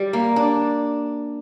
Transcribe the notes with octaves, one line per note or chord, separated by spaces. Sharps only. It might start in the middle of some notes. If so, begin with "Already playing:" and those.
Already playing: G3
A#3
D4